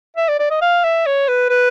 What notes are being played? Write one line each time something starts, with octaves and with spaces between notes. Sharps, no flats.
E5
D5
D5
D#5
F5
E5
C#5
B4
B4